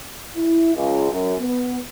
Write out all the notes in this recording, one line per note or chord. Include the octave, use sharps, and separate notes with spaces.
E4
C#2
F#2
B3